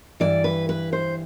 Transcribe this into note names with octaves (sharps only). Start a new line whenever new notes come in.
G2 E3 D5
B4
B4
C5